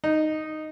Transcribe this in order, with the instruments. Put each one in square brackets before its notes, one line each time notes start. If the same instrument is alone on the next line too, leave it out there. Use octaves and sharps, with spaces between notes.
[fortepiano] D#4